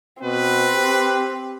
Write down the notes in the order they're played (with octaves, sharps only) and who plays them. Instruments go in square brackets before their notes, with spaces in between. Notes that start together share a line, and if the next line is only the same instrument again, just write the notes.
[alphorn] B2 [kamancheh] C4 [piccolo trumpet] B4
[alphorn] G4